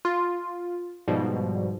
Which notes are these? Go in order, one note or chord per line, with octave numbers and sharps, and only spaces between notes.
F4
G#2 B2 F3 G3